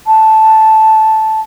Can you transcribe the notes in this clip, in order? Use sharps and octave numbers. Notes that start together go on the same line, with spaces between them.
A5